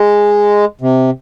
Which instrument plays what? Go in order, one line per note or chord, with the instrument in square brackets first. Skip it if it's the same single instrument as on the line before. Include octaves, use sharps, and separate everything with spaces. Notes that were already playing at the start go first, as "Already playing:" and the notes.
Already playing: [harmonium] G#3
C3